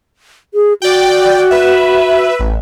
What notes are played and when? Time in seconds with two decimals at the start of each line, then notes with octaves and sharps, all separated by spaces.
0.54 G#4
0.82 F#4 D5 G5
1.51 B4 E5
2.40 A1